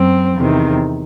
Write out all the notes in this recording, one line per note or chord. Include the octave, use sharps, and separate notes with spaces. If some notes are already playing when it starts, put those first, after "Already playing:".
Already playing: F#2 F#3 C4
E2 C3 D#3